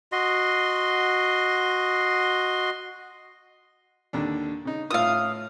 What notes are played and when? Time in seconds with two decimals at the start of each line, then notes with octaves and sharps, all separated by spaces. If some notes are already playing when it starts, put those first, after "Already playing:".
0.12 F#4 D#5 C6
4.13 D#2 D3 D4
4.65 C#3 D#4
4.91 A2 F4 F5 D#6 E6